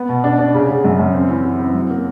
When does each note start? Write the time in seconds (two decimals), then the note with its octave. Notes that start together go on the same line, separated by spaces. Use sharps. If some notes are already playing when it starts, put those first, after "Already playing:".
Already playing: B3
0.09 B2
0.24 D4
0.39 D4
0.54 C#3
0.69 C#3
0.84 F#2
0.99 F#2
1.14 C4
1.29 E3
1.44 E4
1.59 C4
1.74 F#3
1.90 A#3